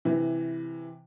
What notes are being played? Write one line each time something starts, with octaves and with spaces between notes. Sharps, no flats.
C3 E3